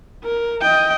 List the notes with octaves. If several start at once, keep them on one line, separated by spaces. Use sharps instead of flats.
A#4
D#5 G5